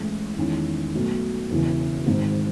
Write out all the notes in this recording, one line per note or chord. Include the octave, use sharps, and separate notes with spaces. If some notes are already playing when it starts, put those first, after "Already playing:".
Already playing: A1 A2 G#3
E2 D#3 G#3 C#4 E4
B1 B2 A3
E1 E2 C#3 E3
G#1 G#2 D#3